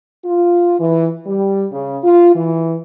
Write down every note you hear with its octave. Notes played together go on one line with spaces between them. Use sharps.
F4
E3
G3
C#3
F4
E3